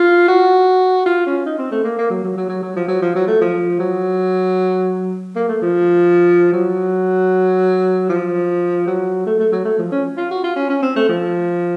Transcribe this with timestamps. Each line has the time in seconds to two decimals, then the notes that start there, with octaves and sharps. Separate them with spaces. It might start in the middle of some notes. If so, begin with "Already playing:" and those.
Already playing: F4
0.28 F#4
1.06 F4
1.27 C#4
1.46 D#4
1.59 C4
1.72 A3
1.84 A#3
1.98 A#3
2.10 F#3
2.24 F#3
2.37 F#3
2.49 F#3
2.62 F#3
2.76 F3
2.88 F#3
3.02 F3
3.15 F#3
3.28 A3
3.41 F3
3.80 F#3
5.36 A#3
5.48 A3
5.62 F3
6.53 F#3
8.10 F3
8.87 F#3
9.26 A3
9.39 A3
9.52 F#3
9.65 A3
9.79 F3
9.92 C#4
10.17 F4
10.31 F#4
10.44 F4
10.56 C#4
10.69 C#4
10.83 C4
10.96 A3
11.09 F3